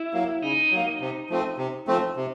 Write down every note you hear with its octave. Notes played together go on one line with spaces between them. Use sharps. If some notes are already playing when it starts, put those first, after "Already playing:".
Already playing: E4
F#3 A#3
C#3 D#4
F#3 A#3
C3
F3 A3 C4
C3
F3 A3 C4
C3